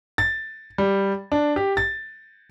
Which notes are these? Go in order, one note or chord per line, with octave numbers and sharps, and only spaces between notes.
A6
G3
D4
G4
A6